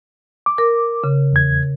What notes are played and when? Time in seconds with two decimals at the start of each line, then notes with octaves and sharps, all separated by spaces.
0.46 D6
0.58 A#4
1.04 C#3
1.33 E2 G#6